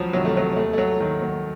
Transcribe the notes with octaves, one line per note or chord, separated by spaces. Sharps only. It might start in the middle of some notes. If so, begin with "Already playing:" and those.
Already playing: C#2 F3 F#3
C3 D#3 F#3
A3
F#3
D#2 A3
A3
F#3
D#3 F#3
F#3